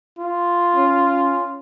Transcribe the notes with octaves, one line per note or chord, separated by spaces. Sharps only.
F4
C#4